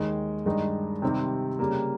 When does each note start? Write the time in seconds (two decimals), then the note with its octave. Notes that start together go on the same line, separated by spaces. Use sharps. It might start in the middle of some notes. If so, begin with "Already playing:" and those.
Already playing: D#2 D#3 G#3
0.46 G2 D#3 G#3 D#4
1.02 C3 D#3 G3 C4
1.59 C#3 G3 A#3